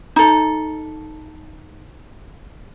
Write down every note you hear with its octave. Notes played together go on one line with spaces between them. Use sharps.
D#4 A4